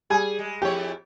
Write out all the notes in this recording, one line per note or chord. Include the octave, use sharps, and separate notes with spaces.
G3 G#4 G#5
G#3
F2 E4 G4 C#5